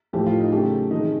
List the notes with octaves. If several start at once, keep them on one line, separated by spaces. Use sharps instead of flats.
A2 F3 A3 G4
F4
D#4
C#3 F#3 A3 G4
C3 D#3 G#3 D#4